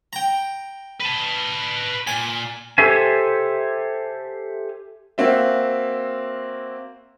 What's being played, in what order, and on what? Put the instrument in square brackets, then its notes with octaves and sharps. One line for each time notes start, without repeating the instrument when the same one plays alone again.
[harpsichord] G5 A#5
[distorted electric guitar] B4 A5
[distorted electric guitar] A#2 [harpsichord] G#5
[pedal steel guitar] G4 A4 C5 E5 G#5
[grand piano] A#3 C4 F#4 E5